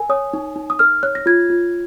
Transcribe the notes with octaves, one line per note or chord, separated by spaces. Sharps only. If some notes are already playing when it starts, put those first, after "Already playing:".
Already playing: A#4 G#5
C#5 D#6
D#4
D#4
D#6
A#4 F6
C#5 F#6
A#6
F4 G#6
F4